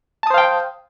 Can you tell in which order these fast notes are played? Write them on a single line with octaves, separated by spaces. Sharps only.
A5 D#6 C5 F5 G5